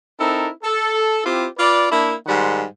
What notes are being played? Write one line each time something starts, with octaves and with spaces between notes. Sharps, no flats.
C4 D#4 E4 A4 A#4
A4
C4 E4 F4 G4
F4 B4 D5
A#3 D4 E4
G#2 D#3 G3 F#5 C6